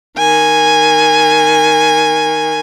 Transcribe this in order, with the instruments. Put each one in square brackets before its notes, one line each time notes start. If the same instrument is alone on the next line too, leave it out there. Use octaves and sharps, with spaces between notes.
[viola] D#3 G#5